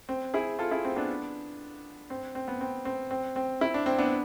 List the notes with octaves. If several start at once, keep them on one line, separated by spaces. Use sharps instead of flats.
C4
E4 G#4
F4 A4
E4 G#4
C4
B3 D4
C4
C4
B3
C4
C4
C4
C4
E4
D4
C4
B3 D4